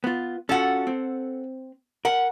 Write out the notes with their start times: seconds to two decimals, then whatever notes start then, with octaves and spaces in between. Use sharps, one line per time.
0.04 B3 F4
0.49 C#4 F4 F#4 A4 F#5
0.87 C4
2.05 A#4 F#5